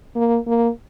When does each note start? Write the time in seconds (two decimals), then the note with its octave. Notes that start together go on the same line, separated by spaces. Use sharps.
0.15 A#3
0.47 A#3